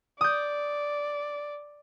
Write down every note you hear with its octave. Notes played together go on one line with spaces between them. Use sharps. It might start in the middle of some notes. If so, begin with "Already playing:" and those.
D5 D#6 G6